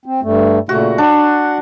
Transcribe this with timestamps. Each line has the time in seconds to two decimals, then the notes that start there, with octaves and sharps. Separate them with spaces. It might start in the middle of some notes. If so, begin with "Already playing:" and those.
0.06 C4
0.23 G2 A3
0.69 A#2 C#3 A3 F#4
0.98 D4 F#5